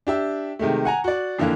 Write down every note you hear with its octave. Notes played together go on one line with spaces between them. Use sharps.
D4 G4 E5
C3 D#3 G#3 A3
F#5 G#5 A#5
F#4 D5
F2 D3 E3 A#3